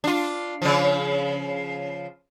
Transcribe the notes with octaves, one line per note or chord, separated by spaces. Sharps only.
D4 F4
C#3 F3